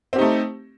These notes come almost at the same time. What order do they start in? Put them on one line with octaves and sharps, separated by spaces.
C4 G4 D#4 A3